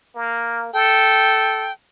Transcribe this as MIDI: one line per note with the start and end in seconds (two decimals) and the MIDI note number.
0.15 0.70 58
0.73 1.70 69
0.73 1.72 79